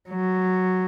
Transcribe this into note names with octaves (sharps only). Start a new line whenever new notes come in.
F#3